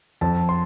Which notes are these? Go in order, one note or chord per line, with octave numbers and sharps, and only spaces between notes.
F2 A5
C6